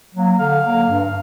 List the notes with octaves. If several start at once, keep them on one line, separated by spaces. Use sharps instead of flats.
F#3 A#3
D3 F5
F#3 A#3
G2